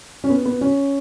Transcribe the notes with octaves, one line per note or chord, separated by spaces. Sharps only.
C#4
B3
B3
C#4